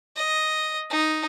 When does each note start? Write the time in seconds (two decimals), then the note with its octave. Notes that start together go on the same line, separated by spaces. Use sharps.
0.16 D#5
0.90 D#4